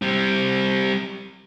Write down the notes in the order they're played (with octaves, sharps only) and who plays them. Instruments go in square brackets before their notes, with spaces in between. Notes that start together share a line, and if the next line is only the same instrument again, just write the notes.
[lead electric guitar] G3 C4